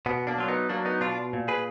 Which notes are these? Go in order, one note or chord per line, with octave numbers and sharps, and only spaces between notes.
B2 B3
A#3 D4
F#3 F4
B3 D#4
F#3 A#3 D4
B3 D#4
B2 D4 F4
A#2
G#4 B4